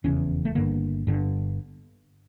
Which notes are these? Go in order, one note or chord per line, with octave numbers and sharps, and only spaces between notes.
F1 E2 C#3 C#4
A3
G1 G2 D3 A#3
G1 G2 D3